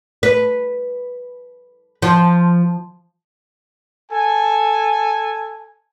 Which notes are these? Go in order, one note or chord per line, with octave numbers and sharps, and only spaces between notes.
B4
F3
A4 G#5